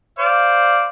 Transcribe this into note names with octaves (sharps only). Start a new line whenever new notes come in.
C5 D5 F5